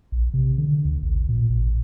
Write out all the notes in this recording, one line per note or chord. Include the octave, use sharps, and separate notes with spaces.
A#1
C3
D3
D2
A1
A#2
A1